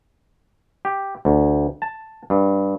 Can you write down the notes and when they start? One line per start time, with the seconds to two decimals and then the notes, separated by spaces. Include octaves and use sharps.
0.85 G4
1.25 D2
1.82 A5
2.30 G2